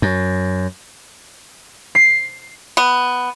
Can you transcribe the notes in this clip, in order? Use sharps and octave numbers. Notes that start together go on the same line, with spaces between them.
F#2
C7
B3